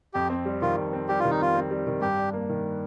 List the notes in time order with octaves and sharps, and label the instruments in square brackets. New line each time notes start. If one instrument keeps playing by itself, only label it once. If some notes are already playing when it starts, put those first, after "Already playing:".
[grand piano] F2 [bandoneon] G4
[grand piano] C4
G3
[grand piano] D#3 [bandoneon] F4
[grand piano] F2
C4
[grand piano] G3 [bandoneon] G4
[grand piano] D#3 [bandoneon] F4
[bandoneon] D#4
[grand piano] F2 [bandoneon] F4
[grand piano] C4
G3
D#3
[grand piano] G2 [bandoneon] G4
[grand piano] D4
A#3
D#3